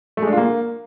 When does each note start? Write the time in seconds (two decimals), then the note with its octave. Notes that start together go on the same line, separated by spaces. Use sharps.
0.17 A3
0.22 G#3
0.27 D4
0.32 F4
0.38 A#3